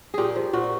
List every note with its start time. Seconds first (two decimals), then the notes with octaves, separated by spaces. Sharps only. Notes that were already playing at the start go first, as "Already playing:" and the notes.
0.14 A#2 G4 G#4
0.36 F3
0.53 A#2 F#4